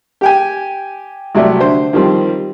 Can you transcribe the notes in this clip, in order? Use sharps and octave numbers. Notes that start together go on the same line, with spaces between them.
G4 G5 G#5
C2 C3 F#3 A3 D5
D3 C5
D#3 F3 G3 C4 F4